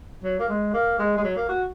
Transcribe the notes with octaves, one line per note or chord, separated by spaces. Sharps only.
F#3
A#3
G#3
A#3
G#3
G#3
F#3
A#3
F#4